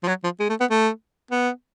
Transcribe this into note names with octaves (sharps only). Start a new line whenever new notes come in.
F3
F#3
F3
G#3
A3
B3
A3
B3